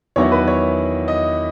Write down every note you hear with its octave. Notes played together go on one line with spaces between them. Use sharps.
E2 D#3 F#3 B3 E4 C#5
B4
C#5
D#5